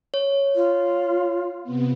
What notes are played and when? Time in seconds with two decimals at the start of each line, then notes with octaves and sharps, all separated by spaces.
0.14 C#5
0.56 F4
1.63 C3 B3